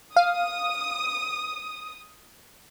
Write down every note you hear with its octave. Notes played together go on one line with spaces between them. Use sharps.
F5 D#6